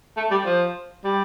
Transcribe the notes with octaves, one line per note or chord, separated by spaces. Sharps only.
A3
G3
F3
G3